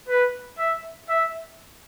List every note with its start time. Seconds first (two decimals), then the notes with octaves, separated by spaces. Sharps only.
0.09 B4
0.58 E5
1.09 E5